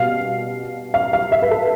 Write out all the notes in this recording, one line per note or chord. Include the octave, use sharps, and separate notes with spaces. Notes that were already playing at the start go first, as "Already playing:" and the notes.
Already playing: B2 G3 F5
F5
F5
E5
B4
A4